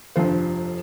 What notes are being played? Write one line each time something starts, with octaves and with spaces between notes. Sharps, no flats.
F1 G2 F3 C5